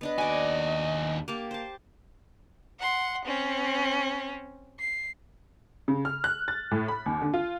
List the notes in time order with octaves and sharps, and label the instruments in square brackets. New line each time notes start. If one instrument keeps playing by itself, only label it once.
[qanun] B3 D4 B4 [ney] D#5
[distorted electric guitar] D#2 G#5 [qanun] F#4 D5
[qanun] A#3 G4 A5
C5 A5
[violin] F#5 C6
C4 C#4
C7
[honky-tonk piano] C#3
F6
F#6
A6
A2
B5
D#2
D3
F4